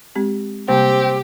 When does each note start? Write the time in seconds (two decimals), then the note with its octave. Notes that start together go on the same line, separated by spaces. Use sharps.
0.15 G#3 C4 G4
0.69 C3 G3 A#3 C4 G4